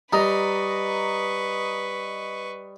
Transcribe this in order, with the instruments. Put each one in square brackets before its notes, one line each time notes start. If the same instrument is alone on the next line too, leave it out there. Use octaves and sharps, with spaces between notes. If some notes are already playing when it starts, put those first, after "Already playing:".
[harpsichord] G3 [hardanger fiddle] B4 C#6 [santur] D#5 A#5